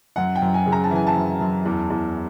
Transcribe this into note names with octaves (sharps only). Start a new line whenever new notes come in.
F#2 F#5
G5
F#2
G#5
C#3
A#5
A5
E3 G#5
A5
F#2
F#2
E2
E2